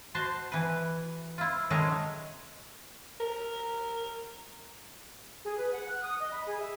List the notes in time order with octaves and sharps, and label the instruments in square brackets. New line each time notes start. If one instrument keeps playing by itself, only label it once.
[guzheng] F#4 C5 A5 C6
E3 B4
E4 F4
D#3 F#3 G#3 A3 C#4 C#5
[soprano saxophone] A#4
[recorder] G#4
B4
F#5
F#6
D#6
D#5
B5
G#4
E5